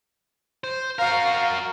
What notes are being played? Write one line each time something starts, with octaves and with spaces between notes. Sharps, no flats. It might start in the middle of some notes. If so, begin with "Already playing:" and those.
C5
F#4 A#4 F5